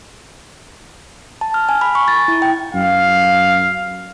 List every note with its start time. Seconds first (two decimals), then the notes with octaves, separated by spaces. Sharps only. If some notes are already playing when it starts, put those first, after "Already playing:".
1.41 A5
1.54 F6
1.69 G#5
1.81 B5
1.95 C#6
2.08 A6
2.28 E4
2.42 G5
2.74 F#2 F5